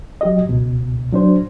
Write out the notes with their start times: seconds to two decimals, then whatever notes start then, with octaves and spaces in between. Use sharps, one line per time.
0.21 F#3 G4 D#5
0.48 C#2 B2
1.12 F#3 D4 C5